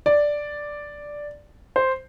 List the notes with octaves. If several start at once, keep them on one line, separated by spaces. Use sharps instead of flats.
D5
C5